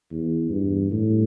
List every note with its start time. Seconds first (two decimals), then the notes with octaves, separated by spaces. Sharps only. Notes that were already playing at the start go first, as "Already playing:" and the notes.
0.11 E2
0.50 G2
0.91 A2